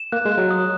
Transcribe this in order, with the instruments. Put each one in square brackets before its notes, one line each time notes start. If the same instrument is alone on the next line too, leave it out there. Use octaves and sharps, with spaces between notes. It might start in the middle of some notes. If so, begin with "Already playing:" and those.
Already playing: [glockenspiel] E7
[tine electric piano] A#3 [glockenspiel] F#6
[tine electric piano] G#3
[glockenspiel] F#6
[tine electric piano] F#3
[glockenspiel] D#6